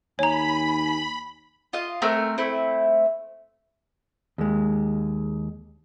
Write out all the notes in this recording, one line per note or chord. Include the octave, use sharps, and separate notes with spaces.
D#2 C#5 G#5 A#5 B5
F4 D#5
A3 C4 A#4 G#5
A3 C4 E4
D#2 G#3